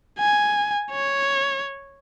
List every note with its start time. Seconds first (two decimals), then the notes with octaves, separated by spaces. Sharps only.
0.19 G#5
0.92 C#5